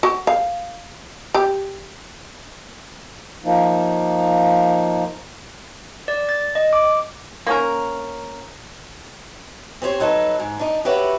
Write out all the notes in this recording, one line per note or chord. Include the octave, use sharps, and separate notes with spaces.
F#4
F5
G4
F3 A#3 D#4
D5
A6
D#5
D6
A#3 C#4 A#4
C4 G4 C5 C#5
F#3 D#4 A4 B4
G#2
D4 D#4
F#4 G4 B4 C#5 E5